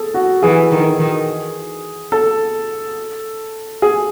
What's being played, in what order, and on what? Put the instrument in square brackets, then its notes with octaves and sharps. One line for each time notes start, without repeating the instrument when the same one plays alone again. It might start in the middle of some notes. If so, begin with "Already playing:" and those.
Already playing: [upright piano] G#4 A4
F#4
[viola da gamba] E3 [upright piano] G#4
[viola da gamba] D#3
D#3
[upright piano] A4
G#4